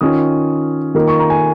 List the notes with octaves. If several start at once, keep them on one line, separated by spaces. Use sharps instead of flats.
D#3 C#4 F4 D#6
D#3 A#3 F4
C#6
A#5
G#5